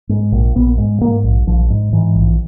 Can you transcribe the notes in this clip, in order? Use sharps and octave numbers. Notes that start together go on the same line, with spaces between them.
G#2
A#1
A#1 B3
G#2
G#2 A#3
A#1
A#1 F3
G#2
G#2 E3
A#1